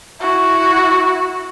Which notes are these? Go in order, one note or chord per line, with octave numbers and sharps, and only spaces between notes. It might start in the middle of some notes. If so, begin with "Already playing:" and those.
E4 F#4